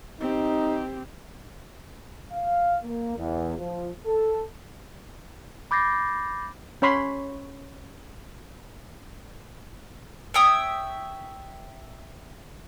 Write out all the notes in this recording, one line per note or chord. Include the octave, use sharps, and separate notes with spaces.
C4 D#4 G4
F5
A#3
E2
F3
A4
B5 D6 G6 A6 A#6 C7
C#4 C#5 B5 C6
C#5 E5 G5 D#6